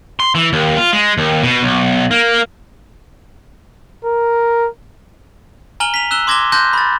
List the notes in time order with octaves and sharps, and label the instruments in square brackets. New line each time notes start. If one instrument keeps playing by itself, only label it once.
[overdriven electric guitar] C6
E3
D#2
F4
G#3
D#2
B2
B1
A#3
[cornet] A#4
[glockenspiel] G#5 A#5 F6 D#7 F#7 G7
B6 F7
E6 F#6 E7 G7
C6 D6 G#6 A#6 E7 G7
A5 C6 F#6 G6 A#6
B5 A6